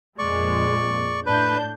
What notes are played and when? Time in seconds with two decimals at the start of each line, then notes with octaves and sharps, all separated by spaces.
0.18 F2 A#2 G#3 D5 C#6
1.26 A2 D4 B4 G6